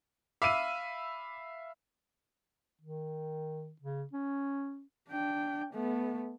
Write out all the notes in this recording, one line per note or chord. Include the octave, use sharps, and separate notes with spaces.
E5 F5 B5 D6 E6 D#7
D#3
C#3
C#4
D4 G5
A3 B3